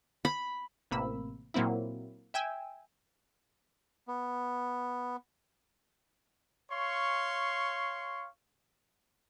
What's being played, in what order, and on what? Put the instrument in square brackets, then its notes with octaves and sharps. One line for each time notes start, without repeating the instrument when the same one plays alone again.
[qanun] B5
[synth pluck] A1 C3 A#3 B5 E6
A#2 F#3 A#3 C4 E4
E5 G5 G#5 E6
[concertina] B3
[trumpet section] C#5 F5 C6 C#6